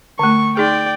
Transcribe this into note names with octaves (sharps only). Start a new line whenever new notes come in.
D3 A3 C#6
D#4 G#4 D5 G5